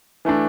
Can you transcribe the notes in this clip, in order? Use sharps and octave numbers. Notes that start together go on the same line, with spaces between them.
E3 A3 D4